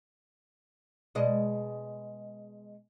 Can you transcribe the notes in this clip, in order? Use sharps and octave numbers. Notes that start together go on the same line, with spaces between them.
B2 G#3 D#5